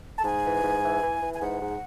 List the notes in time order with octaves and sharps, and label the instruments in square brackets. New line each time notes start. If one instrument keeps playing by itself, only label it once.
[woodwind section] A5
G#2 G#5
E3
G#2
E3
E3
E3
G#5
G#2 F#5
G#2